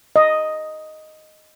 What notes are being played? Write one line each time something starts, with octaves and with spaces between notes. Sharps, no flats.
D#5